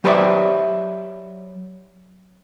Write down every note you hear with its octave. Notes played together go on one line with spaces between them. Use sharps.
F#3 G4 B4 C5 D5 E5